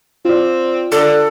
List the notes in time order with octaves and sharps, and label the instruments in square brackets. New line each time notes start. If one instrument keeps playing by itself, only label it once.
[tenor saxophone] C4 [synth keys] F4 D5
[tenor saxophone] D3 [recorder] A4